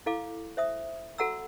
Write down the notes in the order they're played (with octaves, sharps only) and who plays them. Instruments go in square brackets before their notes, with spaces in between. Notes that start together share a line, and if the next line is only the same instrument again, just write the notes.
[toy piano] E4 A4 F5 D6
C5 E5 D#6
F#4 A4 F#5 A#5 E6